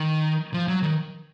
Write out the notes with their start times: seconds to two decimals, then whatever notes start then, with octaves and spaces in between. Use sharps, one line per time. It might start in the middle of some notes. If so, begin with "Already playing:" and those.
Already playing: D#3
0.54 F3
0.68 F#3
0.82 D#3